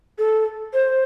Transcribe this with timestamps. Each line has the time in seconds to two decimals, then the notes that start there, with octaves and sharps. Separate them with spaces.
0.18 A4
0.74 C5